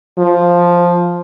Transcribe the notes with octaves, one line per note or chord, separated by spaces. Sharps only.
F3